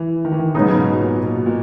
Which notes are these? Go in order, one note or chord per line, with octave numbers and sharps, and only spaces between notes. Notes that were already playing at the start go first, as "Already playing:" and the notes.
Already playing: E3
D#3
E3
D#3
G#2 C#3 F#3 B3 D#4
C#3
B2
A#2
B2
A#2